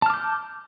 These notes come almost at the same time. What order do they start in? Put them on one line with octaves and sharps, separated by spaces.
A5 F6 D6 G6